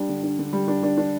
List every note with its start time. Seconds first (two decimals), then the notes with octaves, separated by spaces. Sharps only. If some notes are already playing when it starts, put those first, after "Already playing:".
Already playing: G3 D4
0.09 D3
0.23 D4
0.39 D3
0.53 G3
0.68 D4
0.83 D4
0.98 D4